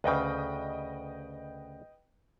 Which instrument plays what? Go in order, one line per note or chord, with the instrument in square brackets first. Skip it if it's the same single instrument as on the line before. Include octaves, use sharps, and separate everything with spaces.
[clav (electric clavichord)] D2 C#3 [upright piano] B4 D#5 G5